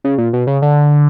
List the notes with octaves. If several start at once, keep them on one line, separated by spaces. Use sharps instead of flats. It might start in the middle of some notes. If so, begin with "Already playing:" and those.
C#3
A#2
B2
C#3
D3